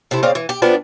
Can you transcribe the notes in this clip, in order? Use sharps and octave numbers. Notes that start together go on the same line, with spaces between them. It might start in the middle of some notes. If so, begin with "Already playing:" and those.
C3 A3 E4
C#3 C4 D5 F5
E3
G4
F3 B3 D4